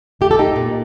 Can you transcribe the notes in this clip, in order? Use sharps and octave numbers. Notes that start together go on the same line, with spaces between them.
A3 G4
A4
D#4 G4
A#2